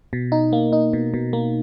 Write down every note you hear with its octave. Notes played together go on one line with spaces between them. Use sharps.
B2
D#4
A#3
D#4
B2
B2
A#3